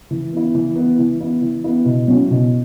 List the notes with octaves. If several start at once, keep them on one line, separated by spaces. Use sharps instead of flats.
E3
B3 E4
E3
B3 E4
E3
B3 E4
E3
B3 E4
B2
F#3 C#4 E4
B2